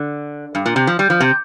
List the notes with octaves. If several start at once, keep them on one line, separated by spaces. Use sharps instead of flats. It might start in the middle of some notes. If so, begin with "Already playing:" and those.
Already playing: D3
G2
A#2
C3
F3
G3
F3
C3